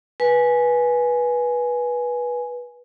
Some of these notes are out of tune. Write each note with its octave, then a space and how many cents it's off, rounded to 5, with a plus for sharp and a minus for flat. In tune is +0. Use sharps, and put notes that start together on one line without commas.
B4 -20 G#5 +10